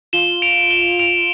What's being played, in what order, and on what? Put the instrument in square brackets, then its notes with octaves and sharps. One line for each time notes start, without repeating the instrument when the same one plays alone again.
[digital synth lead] F4 [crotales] E7 G7
[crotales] D7 F7
E7 G7
D7 F7